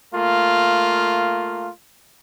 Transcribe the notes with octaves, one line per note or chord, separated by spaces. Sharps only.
A3 A#3 F4